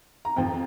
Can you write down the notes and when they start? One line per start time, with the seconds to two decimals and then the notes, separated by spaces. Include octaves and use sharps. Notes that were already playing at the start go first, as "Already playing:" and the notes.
0.25 A#5
0.36 F2 F3 C4 G5